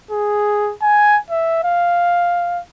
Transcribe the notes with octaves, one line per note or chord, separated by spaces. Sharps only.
G#4
G#5
E5
F5